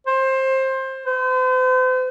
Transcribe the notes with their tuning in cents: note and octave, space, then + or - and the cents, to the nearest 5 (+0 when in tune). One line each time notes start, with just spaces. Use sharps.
C5 +20
C5 -40